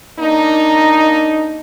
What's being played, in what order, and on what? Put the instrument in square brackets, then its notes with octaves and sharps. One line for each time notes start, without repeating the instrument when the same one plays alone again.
[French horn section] A#3 D4 D#4